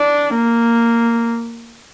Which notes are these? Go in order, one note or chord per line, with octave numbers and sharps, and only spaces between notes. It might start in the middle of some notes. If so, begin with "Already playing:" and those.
Already playing: D4
A#3